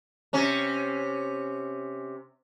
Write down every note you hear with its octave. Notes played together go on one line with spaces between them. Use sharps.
C3 C#4